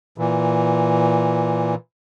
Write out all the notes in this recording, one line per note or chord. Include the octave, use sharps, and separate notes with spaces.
A#2 E3